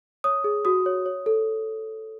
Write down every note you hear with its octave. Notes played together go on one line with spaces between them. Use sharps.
C#5 D#6
G#4
F#4 D#6
C#5
C#5
A4